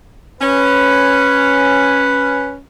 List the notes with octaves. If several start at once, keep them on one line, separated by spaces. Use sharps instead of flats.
C#4 B4